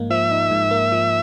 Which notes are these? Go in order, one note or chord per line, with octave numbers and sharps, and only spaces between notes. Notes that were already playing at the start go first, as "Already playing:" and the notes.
Already playing: G#2 F3 A#3 D#4
F3 E5
D#4
G#2
A#3
F3